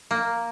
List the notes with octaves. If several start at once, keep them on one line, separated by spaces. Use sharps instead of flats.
A#3